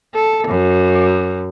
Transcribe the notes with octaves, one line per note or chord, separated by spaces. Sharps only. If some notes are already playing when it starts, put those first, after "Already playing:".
A4
F#2